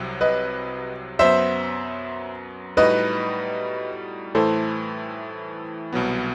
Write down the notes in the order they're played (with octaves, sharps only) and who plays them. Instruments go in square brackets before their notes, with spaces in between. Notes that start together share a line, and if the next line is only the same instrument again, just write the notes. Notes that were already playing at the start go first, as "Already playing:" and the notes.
Already playing: [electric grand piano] C2 C3 F#3
[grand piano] B4 D#5
[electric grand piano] F#2 F#3 B3 [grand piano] C5 E5
[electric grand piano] A2 G3 D#4 F#4 [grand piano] B4 D#5
[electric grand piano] A2 E3 A3 E4 [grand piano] A4 C5
[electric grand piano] C2 B2 F#3 B3